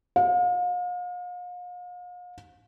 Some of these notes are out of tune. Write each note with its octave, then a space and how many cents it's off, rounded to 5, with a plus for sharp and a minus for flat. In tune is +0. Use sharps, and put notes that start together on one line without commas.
F5 +40